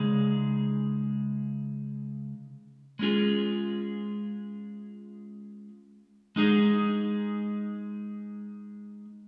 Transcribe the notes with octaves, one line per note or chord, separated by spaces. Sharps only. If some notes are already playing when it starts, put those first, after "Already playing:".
Already playing: C#3 G#3 D#4 G#4
G#3 C#4 F4 G#4
G#3 D#4 G#4